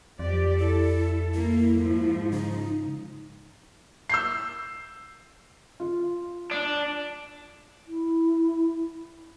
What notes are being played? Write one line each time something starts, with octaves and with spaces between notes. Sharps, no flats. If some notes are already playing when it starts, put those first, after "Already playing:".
F2 F3 G4 D5
E4 A4
A#3 E4
G#2 F3
C#3 D#4
E6 G6 C7
F4
D4
E4